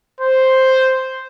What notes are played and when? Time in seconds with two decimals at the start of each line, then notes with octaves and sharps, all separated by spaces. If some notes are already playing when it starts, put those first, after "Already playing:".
0.21 C5